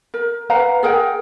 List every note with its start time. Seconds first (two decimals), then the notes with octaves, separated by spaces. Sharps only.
0.14 A#4
0.50 B4 F5 F#5 A#5
0.83 G#4 A#4 F#5 G5